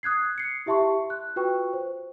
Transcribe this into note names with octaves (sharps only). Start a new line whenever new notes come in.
D#6 F#6 G#6 C7
C7 C#7
E4 G4 E5 A5 C6 C#6
F#6
F4 F#4 B4 G5 C#6
C5